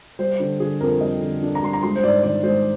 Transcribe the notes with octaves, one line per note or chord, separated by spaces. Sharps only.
G3 C5
D3
D3 G#4
F2 A#4
G3 D#5
D3
D4
A#5
G3 C6
A#5
G#3 C6
C5
G#2 D5
D#3 D5
G#3 C5